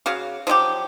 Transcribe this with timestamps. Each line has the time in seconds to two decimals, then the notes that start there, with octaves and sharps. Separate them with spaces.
0.06 C#3 F#4 F5
0.47 F3 F#3 E4 G4